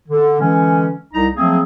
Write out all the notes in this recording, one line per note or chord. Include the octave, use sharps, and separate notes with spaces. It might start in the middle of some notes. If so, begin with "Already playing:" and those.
D3
D3 E3 G#3 C#4
C2 D#4 A#5
F3 F#3 A3 A#3 C4 G#4